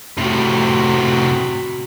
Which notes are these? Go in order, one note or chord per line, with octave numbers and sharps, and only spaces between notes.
A2 C3 F#4 B5